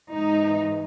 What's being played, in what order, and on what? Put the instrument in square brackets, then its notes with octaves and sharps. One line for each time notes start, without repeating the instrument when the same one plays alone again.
[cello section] G#2 E3 D#4